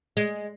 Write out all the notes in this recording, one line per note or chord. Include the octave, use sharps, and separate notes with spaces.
G#3